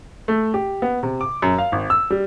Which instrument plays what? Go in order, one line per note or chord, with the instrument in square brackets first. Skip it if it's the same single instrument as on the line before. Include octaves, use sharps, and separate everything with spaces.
[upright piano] A3
G4
B3
C3
D6
F#2
F5
G#1
E6
G3